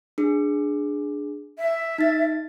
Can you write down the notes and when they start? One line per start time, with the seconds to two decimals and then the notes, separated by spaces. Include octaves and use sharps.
0.18 D4 G#4
1.58 E5
1.98 D#4 A6